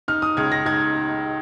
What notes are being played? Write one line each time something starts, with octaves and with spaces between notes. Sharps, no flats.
D#4 F6
D#6
C#2 G#6
A#6
D#4 G#6